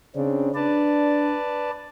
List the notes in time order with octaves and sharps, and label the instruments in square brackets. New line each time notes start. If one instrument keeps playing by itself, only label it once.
[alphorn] C#3 [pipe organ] C4 D4
[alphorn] D4 [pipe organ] B4 D5 A5